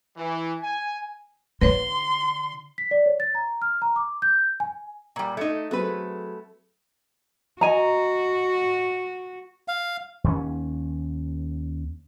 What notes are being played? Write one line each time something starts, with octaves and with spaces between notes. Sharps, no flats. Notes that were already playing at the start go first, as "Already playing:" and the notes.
E3
G#5
D3 B4 C#5 C6
B6
D5
C#5
A6
A#5
F6
A#5
D6
G6
G#5
A#2 G3
A3 D#4 G#6 C#7
F#3 A3 C4 G#4 B4
F#4 D#5 G#5 A#5
F5
D#2 G3 C#4